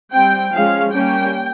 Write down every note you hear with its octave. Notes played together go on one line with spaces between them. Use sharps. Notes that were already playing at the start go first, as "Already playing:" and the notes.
G3 C4 G5
F3 G#3 C#4 F5
G3 A#3 C#4 G5